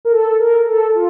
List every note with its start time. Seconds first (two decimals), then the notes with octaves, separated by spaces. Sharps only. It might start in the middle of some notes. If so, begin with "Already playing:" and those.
0.05 A#4
0.12 A4
0.39 A#4
0.67 A4
0.95 F4